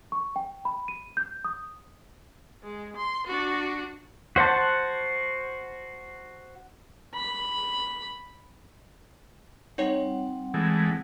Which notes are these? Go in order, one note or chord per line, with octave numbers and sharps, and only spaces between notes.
C#6
G5
B5
D#7
G6
D#6
G#3
C6
D4 F#4
F#4 C5 F#5 A5
B5
G3 C4 D#4 C#5 F#5
E3 G#3 A3